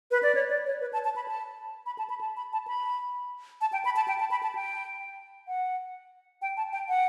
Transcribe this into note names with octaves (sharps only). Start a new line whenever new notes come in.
B4
D5
C#5
D5
C#5
B4
A5
A5
B5
A5
B5
A5
B5
A5
B5
A5
B5
A5
G5
B5
A5
G5
A5
B5
A5
G5
F#5
G5
A5
G5
F#5